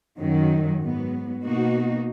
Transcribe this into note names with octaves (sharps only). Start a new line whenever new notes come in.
F#2 D#3 F#3
G#2 F#3 B3
B2 A#3 D#4 F#4